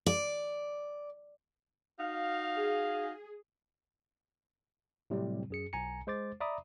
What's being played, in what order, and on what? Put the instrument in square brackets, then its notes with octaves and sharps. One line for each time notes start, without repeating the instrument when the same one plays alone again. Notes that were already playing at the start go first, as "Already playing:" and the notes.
[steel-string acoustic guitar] D5
[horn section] D#4 F#4 F5
[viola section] G#4
[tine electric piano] A2 C3 F#3 G3 C4
F#2 G#4 C#7
B1 G#5 A#5 C#7
G#3 C5 D6 A6
D5 E5 A#5 B5 D6 D#6